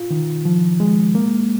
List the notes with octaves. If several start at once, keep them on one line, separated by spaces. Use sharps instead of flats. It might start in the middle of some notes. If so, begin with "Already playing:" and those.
Already playing: F4
D#3
F3
G#3
A#3